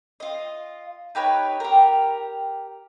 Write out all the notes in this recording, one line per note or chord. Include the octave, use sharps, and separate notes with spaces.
F4 D#5
D#4 G4 B4 C#5
G4 A#4